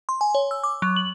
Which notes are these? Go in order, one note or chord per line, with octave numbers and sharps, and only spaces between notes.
C6
G#5
C#5
E6
D6
F#3
F#7